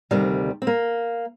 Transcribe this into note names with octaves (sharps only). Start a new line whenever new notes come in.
D2 C3 D#3 G3
C4
A#3